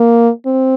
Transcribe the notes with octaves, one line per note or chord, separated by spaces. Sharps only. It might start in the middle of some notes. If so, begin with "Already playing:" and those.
Already playing: A#3
C4